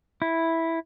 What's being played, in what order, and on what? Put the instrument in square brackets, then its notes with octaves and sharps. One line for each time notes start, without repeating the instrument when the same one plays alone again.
[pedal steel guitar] E4